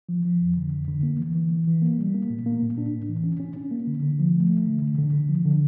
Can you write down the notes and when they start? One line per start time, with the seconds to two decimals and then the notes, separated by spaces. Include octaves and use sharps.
0.09 F3
0.25 F3
0.41 F2
0.57 D3
0.72 F2
0.88 D3
1.03 A#3
1.19 E3
1.35 E3
1.52 E3
1.67 E3
1.82 A#3
1.98 G3
2.15 A#3
2.30 A#2
2.46 A#3
2.62 A#2
2.78 D4
2.93 A2
3.09 E3
3.24 C#4
3.40 C#4
3.56 C#4
3.71 A#3
3.87 D3
4.03 D3
4.19 F3
4.35 A3
4.50 A3
4.66 D3
4.82 D3
4.98 D3
5.13 D3
5.29 F3
5.45 D3